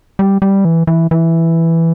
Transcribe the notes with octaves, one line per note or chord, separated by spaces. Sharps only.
G3
G3
E3
E3
E3